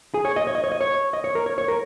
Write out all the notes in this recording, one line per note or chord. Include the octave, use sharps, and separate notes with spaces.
G#4
C#5
D#5
C#5
D#5
C#5
D#5
C#5
D#5
C#5
A#4
C#5
C#5
A#4